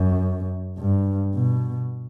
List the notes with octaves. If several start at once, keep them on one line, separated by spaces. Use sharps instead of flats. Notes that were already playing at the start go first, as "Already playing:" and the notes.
Already playing: F#2
G2
B2